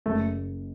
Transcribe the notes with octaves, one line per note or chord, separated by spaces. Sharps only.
F#1 A3